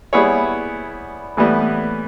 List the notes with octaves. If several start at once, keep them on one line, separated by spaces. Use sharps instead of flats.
G3 B3 E4 G#4 C#5
A2 E3 G3 B3